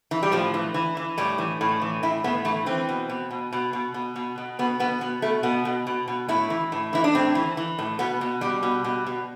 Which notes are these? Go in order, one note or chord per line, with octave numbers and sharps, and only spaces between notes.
E3
G3
A2 F3
E3
E3
E3
A2 G3
E3
A2
E3
A2 E4
A2 B3
E3 A3
E3 C4
B2
B2
B2
B2
B2
B2
B2
B2
B2 B3
B2 B3
B2 B3
B2 A3
B2 B3
B2
B2
B2
A2 E4
E3
A2
E3 E4
D4
A2 C4
E3
E3
A2
B2 B3
B2
B2 G3
B2
B2
B2